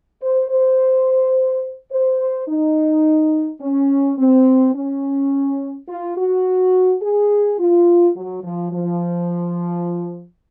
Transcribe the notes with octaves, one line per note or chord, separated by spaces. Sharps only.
C5
C5
C5
D#4
C#4
C4
C#4
F4
F#4
G#4
F4
F#3
F3
F3